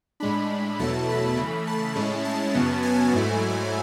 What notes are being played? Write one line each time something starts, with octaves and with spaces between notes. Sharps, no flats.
A2 G#3 D4 B5
E2 B2 F#3 A3 E4 A5
B5
C#3 E3 A3
A5
A2 G#3 C#4 E4
A5
F#2 C#3 F#3 B3
G#5
G#2 F#3 A3 E4